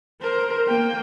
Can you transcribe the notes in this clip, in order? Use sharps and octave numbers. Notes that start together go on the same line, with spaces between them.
A#4 C5
A#3 G5